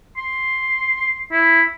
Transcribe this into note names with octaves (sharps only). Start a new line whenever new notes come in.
C6
E4